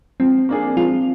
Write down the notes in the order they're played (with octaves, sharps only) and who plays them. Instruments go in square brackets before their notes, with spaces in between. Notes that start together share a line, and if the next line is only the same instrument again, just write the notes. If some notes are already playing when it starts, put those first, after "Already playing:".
[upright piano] F3 [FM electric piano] C4
[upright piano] A#3 D4 G#4
[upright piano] F3 [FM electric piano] F4